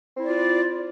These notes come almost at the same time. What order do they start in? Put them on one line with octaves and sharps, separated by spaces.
C4 E4 D5 F4